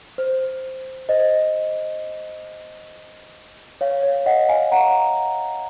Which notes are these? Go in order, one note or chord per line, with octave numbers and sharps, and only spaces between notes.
C5
C5 D#5
C#5 F5
C#5 F5
D#5 F#5
F5 G#5
F#5 A#5